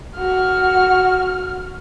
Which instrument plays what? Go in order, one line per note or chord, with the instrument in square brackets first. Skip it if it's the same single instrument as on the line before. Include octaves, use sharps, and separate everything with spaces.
[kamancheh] F#4 F6